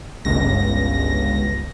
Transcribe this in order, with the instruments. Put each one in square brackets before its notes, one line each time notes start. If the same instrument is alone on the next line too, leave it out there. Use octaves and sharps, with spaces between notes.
[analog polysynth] G1 C#2 A#6